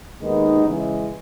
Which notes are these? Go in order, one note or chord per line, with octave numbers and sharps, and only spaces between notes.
D#2 D#3 G#3 B3 D#4
C#3 E3 G#3